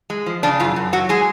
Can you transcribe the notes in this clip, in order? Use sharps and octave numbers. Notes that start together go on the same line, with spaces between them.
G#3
F3
C#3 D4
F#2 F4
F#2
F#3 F#4
G#3 G#4